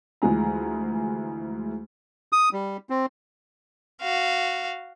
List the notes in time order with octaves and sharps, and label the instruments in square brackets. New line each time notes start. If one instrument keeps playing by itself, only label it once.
[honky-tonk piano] D2 E3 F3 G#3 G#4 A#5
[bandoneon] D#6
G3
C4
[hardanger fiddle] F#4 F5